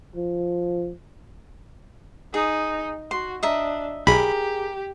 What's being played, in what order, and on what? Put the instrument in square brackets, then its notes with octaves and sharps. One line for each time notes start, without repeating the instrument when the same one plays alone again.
[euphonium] F3
[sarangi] D#4 [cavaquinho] G#4
[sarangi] F#4 [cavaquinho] C6
[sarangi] D4 [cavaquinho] D#5 E5 A#5
[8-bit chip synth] B1 B5 [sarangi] G4 [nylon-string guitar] G#4 [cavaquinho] A#4 A#5